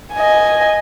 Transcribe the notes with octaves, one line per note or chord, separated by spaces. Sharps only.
D#5 G#5